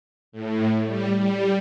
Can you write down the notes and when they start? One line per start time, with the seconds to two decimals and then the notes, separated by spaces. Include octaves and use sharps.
0.32 A2
0.86 G3
1.18 G3